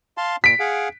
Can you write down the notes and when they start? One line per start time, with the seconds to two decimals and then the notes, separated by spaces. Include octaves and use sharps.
0.18 F5 A5 C6
0.44 A#2 B6 D7
0.60 G#4 F5 F#5